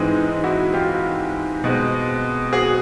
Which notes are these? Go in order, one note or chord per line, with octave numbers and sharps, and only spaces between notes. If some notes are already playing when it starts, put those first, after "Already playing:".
Already playing: G#2 E3 G#3 C4 D#4
D#4
E4 F#4
F4 G4
B2 G#3 C4
F#4 G#4